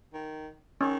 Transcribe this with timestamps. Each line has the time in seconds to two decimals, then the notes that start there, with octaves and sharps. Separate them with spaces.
0.14 D#3
0.81 D#3 C#4